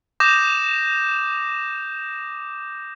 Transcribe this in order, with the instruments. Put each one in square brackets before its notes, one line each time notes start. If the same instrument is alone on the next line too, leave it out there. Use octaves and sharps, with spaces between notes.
[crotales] D6 D#6 G6 A#6 E7